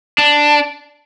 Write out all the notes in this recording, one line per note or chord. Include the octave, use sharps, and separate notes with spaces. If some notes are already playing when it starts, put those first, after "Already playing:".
D4